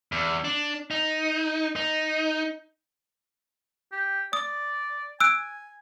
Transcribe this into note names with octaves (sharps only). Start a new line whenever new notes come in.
E2
D4
D#4
D#4
G4
D5 D#6
G#5 E6 F#6 D7